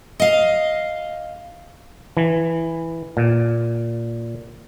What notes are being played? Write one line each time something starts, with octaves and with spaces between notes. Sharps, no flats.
D#5 F5
E3
A#2